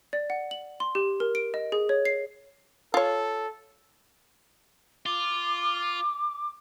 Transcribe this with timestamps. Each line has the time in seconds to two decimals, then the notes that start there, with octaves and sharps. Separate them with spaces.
0.13 D5
0.30 F#5
0.51 F#7
0.80 C6
0.95 G4
1.20 A#4
1.35 D7
1.54 D#5
1.72 G#4
1.89 C#5
2.05 C7
2.94 F4 A4 C#5
5.06 F4 D6